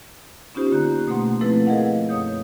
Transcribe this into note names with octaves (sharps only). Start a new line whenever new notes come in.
B3 C#4 D#4 F4 G4 C5
D3 A#3 F4 A#5 F#6 G6
B2 A3 A#3 F#5 C6
F3 A3 C4 E4 A4 B4
G#4 A#4 B4 D#5 F5 F#5
F#2 C#5 D#6 G6